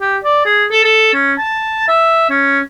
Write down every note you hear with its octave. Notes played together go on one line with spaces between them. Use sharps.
G4
D5
G#4
A4
A4
C#4
A5
E5
C#4